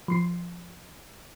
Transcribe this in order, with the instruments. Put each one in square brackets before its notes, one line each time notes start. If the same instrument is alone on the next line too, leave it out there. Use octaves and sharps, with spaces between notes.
[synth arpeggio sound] F3 C6 C7